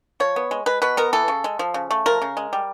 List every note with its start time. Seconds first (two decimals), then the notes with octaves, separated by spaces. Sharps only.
0.20 F3 C#5
0.36 B3
0.51 G#3
0.66 G#3 B4
0.82 B2 B4
0.97 B3 A#4
1.13 E3 A4
1.28 C#3
1.44 G#3
1.59 F3
1.74 C#3
1.91 A3
2.06 F3 A#4
2.22 C#3
2.37 G#3
2.53 G3